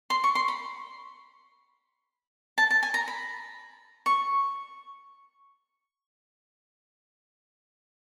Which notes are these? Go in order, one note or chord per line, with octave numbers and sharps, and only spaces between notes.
C6
C#6
C6
B5
A5
A5
G#5
A#5
B5
C#6